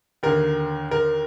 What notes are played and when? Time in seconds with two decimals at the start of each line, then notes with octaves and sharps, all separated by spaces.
0.23 D#2 D3 A#4
0.91 A#4